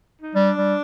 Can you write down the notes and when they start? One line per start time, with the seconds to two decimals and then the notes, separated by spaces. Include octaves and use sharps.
0.22 D#4
0.35 G3 D4
0.58 G3